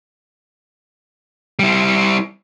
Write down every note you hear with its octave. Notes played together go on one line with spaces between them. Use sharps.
G3 E4